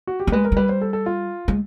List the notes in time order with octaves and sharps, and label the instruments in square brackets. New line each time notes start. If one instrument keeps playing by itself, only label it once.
[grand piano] F#4
G4
[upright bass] A3
[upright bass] G#3 [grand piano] B4
[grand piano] A#4
[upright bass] G#3
[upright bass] G3 [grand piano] B4
[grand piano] C5
A4
A4
F4
[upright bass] G#3